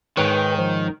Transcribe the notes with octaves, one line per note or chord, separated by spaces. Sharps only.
G#2 D#3 B4 C#5 G5
F3